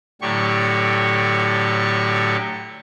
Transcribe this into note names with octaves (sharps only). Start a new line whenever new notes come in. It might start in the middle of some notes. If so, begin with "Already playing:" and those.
A2 D3 F#3 G4 C#6